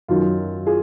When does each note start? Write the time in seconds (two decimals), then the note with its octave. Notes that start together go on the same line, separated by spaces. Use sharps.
0.08 F#2 D#3 F#3 F4
0.66 F4 G#4